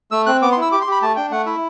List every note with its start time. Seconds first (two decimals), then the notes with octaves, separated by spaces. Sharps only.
0.11 A3 E6
0.26 C4 F#6
0.42 B3 D6
0.52 C6
0.57 E4
0.62 E6
0.72 G4 D6
0.81 C6
0.87 G4
0.92 B5
1.02 A3 A5
1.16 D4 G5
1.31 A3 F#5
1.46 E4 E5